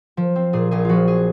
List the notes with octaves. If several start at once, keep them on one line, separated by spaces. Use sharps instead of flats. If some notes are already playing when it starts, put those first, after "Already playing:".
F3
C4
A#2 G#4
A#1 G#4
F3 F4 F#4
G#4